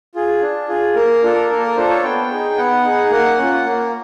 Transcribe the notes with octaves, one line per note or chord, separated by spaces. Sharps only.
F4 G#4
D4
F4 G#4
A#3 A#4
D4 F4 A4
A#3 A4
A#4
D4 F4 A4 C5
C#5
B3 G5
D#4 G#4
B3 F#5
D#4 G#4
A#3 F#5
C#4 F4
A#3